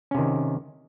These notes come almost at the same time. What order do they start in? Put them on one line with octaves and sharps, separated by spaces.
C#4 C3 D#3